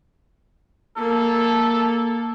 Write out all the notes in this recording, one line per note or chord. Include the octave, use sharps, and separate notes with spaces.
A#3 A4